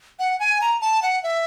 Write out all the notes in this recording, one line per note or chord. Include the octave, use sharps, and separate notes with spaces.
F#5
G#5
A#5
A5
F#5
E5